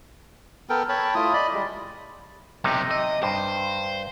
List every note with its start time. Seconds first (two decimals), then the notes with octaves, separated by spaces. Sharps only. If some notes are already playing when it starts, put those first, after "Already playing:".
0.70 B3 A4 A#4 G5
0.89 C#5 G5 A5 B5
1.15 A3 E4 F4 D#6
1.34 D5 D#5 B5
1.53 G3 G#3
2.64 B1 C3 D#4 G4
2.91 D#5
3.23 G2 C5